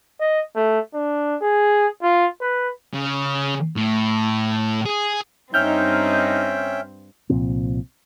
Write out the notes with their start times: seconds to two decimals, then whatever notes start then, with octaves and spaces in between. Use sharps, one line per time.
0.20 D#5
0.56 A3
0.94 D4
1.42 G#4
2.03 F4
2.41 B4
2.93 C#3
3.76 A2
4.85 G#4
5.54 G2 C4 C#4 D#4 E5 G5 F6 G6
7.30 C2 A#2 F3 C4